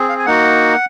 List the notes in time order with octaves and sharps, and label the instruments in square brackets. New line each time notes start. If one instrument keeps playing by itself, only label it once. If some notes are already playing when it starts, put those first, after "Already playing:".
Already playing: [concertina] C4 G#4
F5
G#5
A#3 D#4 F#4 F#5